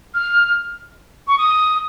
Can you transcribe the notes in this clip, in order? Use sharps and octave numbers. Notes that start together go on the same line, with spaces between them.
F6
C#6
D#6